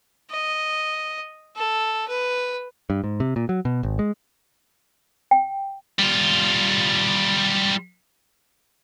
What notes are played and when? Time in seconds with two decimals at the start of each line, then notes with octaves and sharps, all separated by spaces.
0.31 D#5
1.56 A4
2.08 B4
2.90 G2
3.04 G#2
3.20 C3
3.36 A#2
3.49 F#3
3.65 B2
3.83 G#1
3.99 G#3
5.31 G5
5.99 G3 F4